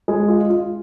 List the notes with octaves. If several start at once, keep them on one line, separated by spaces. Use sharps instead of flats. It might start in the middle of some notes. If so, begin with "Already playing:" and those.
G#3
F4
F4